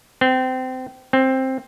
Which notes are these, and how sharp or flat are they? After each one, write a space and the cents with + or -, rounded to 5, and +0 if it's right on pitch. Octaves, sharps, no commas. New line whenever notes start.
C4 -25
C4 +10